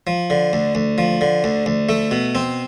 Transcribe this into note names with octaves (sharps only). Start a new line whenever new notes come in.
F3
D3
D2
D2
F3
D3
D2
D2
A3
B2
C4